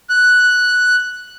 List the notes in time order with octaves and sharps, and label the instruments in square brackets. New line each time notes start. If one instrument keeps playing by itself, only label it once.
[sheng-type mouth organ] F#6